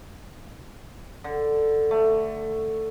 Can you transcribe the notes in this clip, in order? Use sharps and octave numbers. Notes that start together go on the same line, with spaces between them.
D3
A3